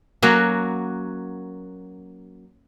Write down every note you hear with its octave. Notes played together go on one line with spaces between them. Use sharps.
F#3 A#3 C#4 F#4